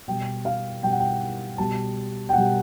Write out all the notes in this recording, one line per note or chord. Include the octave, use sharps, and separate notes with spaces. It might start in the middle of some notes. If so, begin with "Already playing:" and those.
B2 G3 G5
F5
B2 G3 G5
F#5
G5
B2 G3 A5
G5
B2 G3 F#5